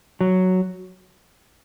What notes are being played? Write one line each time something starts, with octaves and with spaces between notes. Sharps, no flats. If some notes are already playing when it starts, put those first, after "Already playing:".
F#3